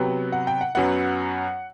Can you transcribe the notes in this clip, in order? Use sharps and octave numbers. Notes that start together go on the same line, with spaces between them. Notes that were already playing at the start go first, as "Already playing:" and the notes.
Already playing: C3 F#3 B3 G5
F#5
G5
F#5
F#2 F#3 B3 F#5